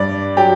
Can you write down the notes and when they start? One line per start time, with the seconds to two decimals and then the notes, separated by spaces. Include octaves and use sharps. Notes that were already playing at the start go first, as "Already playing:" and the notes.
Already playing: G2 D5
0.36 F#3 G4